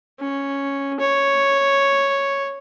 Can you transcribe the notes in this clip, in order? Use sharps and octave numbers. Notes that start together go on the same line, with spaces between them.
C#4
C#5